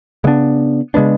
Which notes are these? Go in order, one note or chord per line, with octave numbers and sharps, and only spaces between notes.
C#3 G#3 B3 D4
C#3 G#3 B3 D4